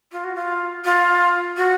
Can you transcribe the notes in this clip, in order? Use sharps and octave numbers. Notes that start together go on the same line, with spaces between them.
F4
F#4
F4
F4
F#4